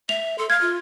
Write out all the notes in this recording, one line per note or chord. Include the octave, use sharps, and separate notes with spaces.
E5 F7
A4 C6
F5 F6 G#6
F4